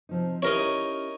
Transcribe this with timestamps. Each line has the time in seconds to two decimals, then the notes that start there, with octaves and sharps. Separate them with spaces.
0.09 C3 F3 D#4
0.42 C#4 D#4 E4 G4 A#4 C#5